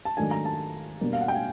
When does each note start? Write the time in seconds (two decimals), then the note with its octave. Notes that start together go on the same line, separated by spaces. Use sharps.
0.05 A5
0.17 G#2 D#3 F#3 A3 D4 G#5
0.31 A#5
0.45 A5
1.01 B2 G3 A#3 D4
1.13 F5
1.21 F#5
1.28 G5
1.35 G#5